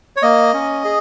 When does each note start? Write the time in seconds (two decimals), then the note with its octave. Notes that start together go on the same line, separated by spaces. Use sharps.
0.16 C#5
0.22 A#3 D#5
0.54 C#4
0.84 G#4